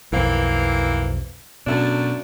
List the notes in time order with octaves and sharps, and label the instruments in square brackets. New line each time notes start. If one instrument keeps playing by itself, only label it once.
[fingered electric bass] B1 F2 [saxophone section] E3 A#3 C4
[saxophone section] F#2 A3 D4 [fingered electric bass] B2